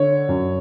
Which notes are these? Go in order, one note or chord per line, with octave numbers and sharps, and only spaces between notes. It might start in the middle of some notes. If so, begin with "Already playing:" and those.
Already playing: D3 C#5
F#2